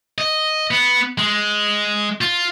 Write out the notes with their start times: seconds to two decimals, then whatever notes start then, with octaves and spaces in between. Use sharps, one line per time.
0.18 D#5
0.71 B3
1.18 G#3
2.21 F4